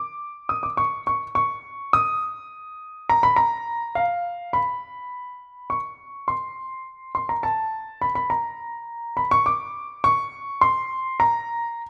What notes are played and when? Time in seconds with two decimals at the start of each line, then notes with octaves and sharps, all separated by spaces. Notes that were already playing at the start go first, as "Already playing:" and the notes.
Already playing: D6
0.49 D#6
0.63 D6
0.77 C#6
1.07 C#6
1.35 C#6
1.93 D#6
3.09 A#5
3.23 B5
3.36 A#5
3.95 F5
4.53 B5
5.70 C#6
6.28 C6
7.15 C6
7.29 A#5
7.43 A5
8.02 B5
8.15 B5
8.30 A#5
9.17 B5
9.31 C#6
9.46 D6
10.04 C#6
10.61 C6
11.20 A#5